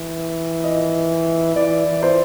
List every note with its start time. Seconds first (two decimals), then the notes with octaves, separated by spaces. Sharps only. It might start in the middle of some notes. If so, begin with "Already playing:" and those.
Already playing: E3
0.64 D#5
1.56 E3 D5
1.87 E3
2.03 C5